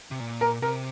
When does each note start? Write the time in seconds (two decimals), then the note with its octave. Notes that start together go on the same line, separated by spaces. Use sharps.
0.11 C3
0.20 A#2
0.41 A#4
0.62 C3 A#4